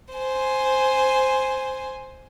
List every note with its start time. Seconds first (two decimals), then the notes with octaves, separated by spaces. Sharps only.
0.14 C5 G#5